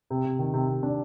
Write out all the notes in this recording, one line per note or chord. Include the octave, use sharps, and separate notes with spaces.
C3
C3
D#3
C3
C3
D4